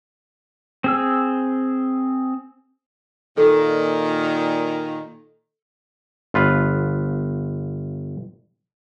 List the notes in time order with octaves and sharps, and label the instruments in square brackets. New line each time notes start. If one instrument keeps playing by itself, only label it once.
[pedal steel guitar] C4 G#4 E6
[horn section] A#2 D#3 [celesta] A4
[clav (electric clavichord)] G1 F4 B4